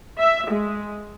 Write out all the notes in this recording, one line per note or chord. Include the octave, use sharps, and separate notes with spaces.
E5
G#3